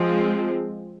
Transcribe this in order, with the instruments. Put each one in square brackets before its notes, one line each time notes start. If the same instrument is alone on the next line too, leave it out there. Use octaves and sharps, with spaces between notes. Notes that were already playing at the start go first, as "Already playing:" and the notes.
Already playing: [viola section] F3 G#3 C4